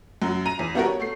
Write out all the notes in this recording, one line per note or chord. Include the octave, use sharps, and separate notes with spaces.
F#2 F#3
A#5 D#7
E2
G3 B3 D4 F#4 G4 A#4
C#5
A3 C7